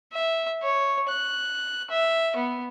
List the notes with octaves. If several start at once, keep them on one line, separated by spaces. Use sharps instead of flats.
E5
C#5
F#6
E5
B3